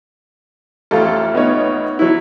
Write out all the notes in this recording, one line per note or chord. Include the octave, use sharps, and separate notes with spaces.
A1 F2 F4 A4
B3 D#4 C#5
F#3 E4